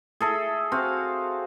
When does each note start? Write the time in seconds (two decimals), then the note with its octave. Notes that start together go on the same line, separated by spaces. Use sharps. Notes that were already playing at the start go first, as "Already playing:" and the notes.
0.20 G#4 A4 E5
0.72 C4 F#4 F5